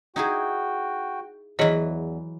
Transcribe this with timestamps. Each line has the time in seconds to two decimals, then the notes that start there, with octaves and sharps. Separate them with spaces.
0.16 D#4 E4 F#4 G#4 G5
1.59 E2 E3 F#3 G#4 C#5 D#5